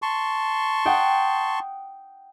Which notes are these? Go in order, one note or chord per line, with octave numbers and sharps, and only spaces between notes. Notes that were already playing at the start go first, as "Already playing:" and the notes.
A5 C6 C#6
F#5 G5 D#6